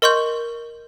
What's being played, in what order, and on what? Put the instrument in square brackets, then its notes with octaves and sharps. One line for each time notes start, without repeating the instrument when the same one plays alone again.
[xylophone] A#4 D#5 C6 C#6 G6